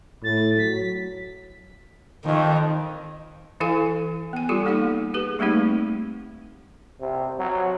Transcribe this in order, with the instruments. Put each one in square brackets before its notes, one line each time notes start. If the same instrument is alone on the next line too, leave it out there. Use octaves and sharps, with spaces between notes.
[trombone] A2 [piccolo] A6
[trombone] F#3 [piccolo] B6
[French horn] F2 [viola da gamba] D#3
[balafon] E3 E4 A4 F5 G#5
B3 G#5
G3 F4 G4 A4
A#3 D#4 G4 F#5
G4 G#4 B4
G3 A3 A#3 C4 D#4 G4
[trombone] C3
F#3